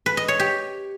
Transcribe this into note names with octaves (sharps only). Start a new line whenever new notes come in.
B4
D#5
C#5
G4